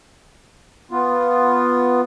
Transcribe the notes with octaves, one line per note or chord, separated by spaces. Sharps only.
B3 F4